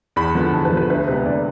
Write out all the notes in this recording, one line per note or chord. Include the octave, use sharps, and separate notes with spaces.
E2 B5
D3 F3 B3
E2 A5
B4
D3 F3 B3
B4
D2 B4
C3 G#3 B3 B4
D2 D5